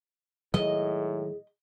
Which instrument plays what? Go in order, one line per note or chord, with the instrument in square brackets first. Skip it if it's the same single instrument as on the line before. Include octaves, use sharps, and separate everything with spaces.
[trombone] A2 [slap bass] D#3 F#3 G#3 [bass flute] G#4 [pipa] D#5